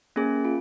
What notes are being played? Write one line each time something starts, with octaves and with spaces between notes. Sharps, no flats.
A#3 C#4 G#4
F4